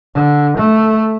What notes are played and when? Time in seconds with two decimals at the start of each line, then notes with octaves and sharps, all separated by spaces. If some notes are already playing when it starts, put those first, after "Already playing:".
0.15 D3
0.58 A3